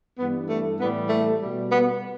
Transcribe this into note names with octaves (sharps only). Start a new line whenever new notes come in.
G2 E3 G3 B3
A3
A2 E3 G3 B3
A3
G3
B2
B3